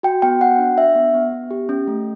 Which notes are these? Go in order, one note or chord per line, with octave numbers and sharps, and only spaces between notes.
F#4 G5
B3 G5
F#4 F#5
D4
D4 E5
B3
B3
B3
G4
C#4
A3